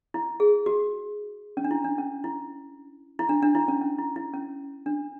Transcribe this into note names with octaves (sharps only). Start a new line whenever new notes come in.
E4
G#4
F#4
C#4
D4
E4
D4
C#4
E4
E4
D4
D4
E4
C#4
C#4
E4
E4
C#4
D4